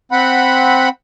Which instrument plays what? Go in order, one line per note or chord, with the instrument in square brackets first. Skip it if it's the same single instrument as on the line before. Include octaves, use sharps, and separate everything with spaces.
[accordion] C4 F#5 B5